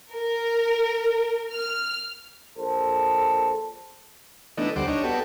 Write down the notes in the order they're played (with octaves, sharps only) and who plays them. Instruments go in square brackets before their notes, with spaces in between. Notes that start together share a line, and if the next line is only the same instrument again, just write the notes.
[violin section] A#4
F6
[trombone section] A#1 A4 C5
[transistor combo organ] E3 A3 B3 D4 D#4
D2 G3 C5 F#5 D6
D4 D#4 C#5
B3 F#4 G4 A4